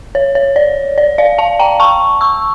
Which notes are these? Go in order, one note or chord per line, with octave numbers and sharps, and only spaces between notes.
C#5
C#5
D5
D5
D5 F5
F5 A5
G5 A#5
A5 C#6
C#6 E6